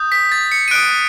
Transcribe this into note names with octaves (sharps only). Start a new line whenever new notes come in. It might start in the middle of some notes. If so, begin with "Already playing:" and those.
Already playing: D#6 G6
B6
A6
C#7
D#7
D#6 F#6 D7